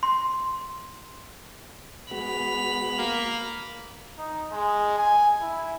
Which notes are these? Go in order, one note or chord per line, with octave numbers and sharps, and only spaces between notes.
C6
G#3 B3 F#4 B5 F7
A#3
D#4
G#3
G#5
E4